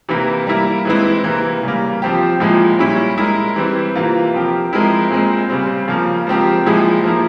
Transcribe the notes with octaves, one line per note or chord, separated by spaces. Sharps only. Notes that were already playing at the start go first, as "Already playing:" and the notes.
C3 E3 A#3 E4
G3 A#3 E4
E3 G#3 C4 E4
C3 E3 A#3
C#3 G3 A#3
F3 C4 G4
A#2 F3 G#3 E4
A#2 G3 C#4 E4
G#3 E4 A#4
E3 G3 C4
C3 E3 A#3 F4
F3 C4 G4 A#4
F3 G#3 C4 E4 A#4
A#2 G#3 C4
C#3 G3 C4
C#3 F3 A#3
F3 G#3 C4 G4 A#4
A#2 F3 G#3 E4 G#4
F3 A#3 E4